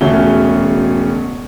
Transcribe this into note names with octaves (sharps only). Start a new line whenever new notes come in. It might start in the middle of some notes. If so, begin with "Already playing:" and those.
E1 C#3 A3 C#4 F#4 G7